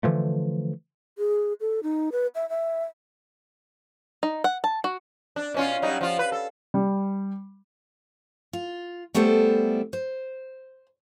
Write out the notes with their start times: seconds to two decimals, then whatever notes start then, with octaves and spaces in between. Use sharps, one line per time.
0.03 D3 E3 F3 A3
1.18 G#4
1.61 A4
1.83 D#4
2.12 B4
2.35 E5
2.49 E5
4.23 D#4
4.44 F#5
4.64 A5
4.84 F#4
5.36 D4
5.54 B2 C#4 F4
5.82 F#3 G3 D#4
6.01 F3 F4
6.19 B4
6.32 A4
6.74 G3
8.53 F4
9.14 G3 A3 B3 E4 A4 C5
9.93 C5